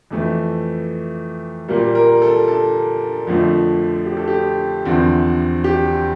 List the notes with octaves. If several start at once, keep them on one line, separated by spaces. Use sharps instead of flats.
F2 E3 A3
A#2 G3 A#3
A#4
A4
A4
F2 D3 F3 A3
G4
A4
G4
E2 D3 F3 C4
G4